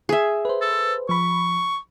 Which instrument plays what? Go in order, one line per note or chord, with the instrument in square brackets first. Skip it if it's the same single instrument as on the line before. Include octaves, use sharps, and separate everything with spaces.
[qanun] G#4 E5
[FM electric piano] B4 C5
[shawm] A4
[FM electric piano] F3 B5 [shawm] C#6